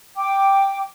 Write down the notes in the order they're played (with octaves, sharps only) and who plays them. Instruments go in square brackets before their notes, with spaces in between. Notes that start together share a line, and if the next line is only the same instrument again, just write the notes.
[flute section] G5 D6